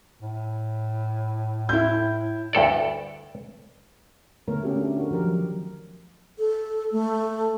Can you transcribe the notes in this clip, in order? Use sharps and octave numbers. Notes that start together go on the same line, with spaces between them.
A2
E4 G6
D2 G2 A4 D5
D3 A3 B3 A#4 C#5
A3 C#4 F#4 G4 A4 A#4
A3 D4
F#4 A#4
D#3 F3 G4 A#4
F3 F#3
A4
A3